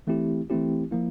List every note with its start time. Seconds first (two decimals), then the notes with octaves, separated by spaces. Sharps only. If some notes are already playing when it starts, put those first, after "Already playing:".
0.07 E3 A3 C4 E4 G4
0.50 E3 A3 C4 E4 G4
0.91 F3 A#3 E4